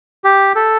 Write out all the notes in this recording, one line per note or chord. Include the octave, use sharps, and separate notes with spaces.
G4
A4